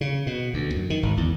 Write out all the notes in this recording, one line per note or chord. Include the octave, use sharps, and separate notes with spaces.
C#3
B2
D2
F#2
D#3
G#1
E2